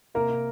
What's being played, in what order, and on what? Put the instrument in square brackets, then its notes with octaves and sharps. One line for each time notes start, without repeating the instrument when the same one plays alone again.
[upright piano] C3 A#3 A#4
C3